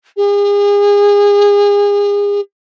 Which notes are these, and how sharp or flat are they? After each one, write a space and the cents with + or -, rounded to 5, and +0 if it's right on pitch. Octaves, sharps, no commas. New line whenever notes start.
G#4 -35